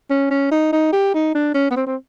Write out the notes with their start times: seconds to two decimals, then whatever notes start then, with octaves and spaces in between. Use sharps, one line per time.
0.10 C#4
0.31 C#4
0.51 D#4
0.72 D#4
0.92 G4
1.14 D#4
1.35 D4
1.55 C#4
1.71 B3
1.76 C4
1.87 C4